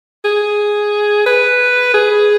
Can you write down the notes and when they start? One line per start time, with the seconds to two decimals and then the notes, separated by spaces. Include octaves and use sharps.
0.25 G#4
1.26 B4
1.94 G#4